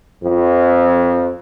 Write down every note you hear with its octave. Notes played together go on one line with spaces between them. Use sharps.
F2